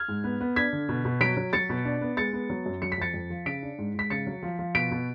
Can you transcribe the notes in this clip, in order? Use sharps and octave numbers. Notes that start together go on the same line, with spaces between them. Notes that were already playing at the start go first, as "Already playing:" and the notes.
Already playing: F6 G#6
G#2
B3
B3
D4 G#6 B6
D3
B2
B2
F#3 B6 D7
F#3
F#3 A6 C#7
B2
D4
B3
G#3 A6 C#7
B3
F#3
F#2
F#3 C#7
B6
F2 A6 C#7
F2
F3
C#3 B6 D7
D4
G#2
G#2 B6
C#3 A6 C#7
F#3
F3
F3
B2 B6 D7
B2